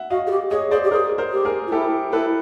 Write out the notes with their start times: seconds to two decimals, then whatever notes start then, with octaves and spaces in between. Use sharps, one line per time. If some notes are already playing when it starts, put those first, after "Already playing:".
Already playing: E5 F#5
0.10 F#4 D#5 F5
0.27 G#4
0.31 G4
0.51 G#4 C#5 D#5
0.71 G#4 C5 D5
0.84 G4
0.91 G#4 A#4 C5
1.18 A#4 C5
1.32 G4
1.45 G#4 A#4
1.67 F4
1.72 E4 G4 A4
2.13 E4 A4 B4